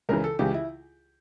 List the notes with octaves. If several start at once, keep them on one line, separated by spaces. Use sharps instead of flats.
C#2 C#3 E3 A#4
A4
C#2 C#3 E3 G4
E4